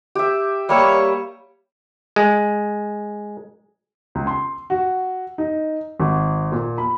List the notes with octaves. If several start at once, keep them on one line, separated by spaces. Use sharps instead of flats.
G4 E5
G3 A#3 C#5 E5
G#3
C#2
C6
F#4
D#4
G#1
A#2
B5